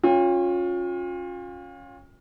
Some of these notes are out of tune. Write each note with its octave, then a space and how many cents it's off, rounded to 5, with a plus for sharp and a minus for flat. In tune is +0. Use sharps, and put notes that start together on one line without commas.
C#4 +0 F4 +30 G5 +45